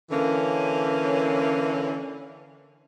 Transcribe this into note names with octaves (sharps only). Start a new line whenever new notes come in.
D3 E3 A#3 C#4